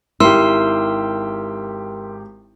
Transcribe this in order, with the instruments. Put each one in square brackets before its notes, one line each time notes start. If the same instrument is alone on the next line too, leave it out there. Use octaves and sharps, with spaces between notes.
[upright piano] G#1 G4 [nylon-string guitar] E4 [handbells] A#4 C6 E6